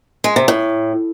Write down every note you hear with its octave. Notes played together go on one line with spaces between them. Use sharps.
G#3
C3
A2